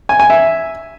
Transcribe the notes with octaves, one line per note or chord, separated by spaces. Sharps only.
G#5
G#5
E5